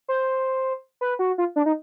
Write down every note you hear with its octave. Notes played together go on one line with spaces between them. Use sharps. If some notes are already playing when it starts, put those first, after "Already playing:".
C5
B4
F#4
F4
D4
D#4